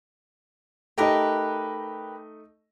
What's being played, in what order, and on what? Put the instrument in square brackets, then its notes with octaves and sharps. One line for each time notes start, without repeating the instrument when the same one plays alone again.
[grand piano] A3 D#4 D#5 [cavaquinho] G4 A#4 B4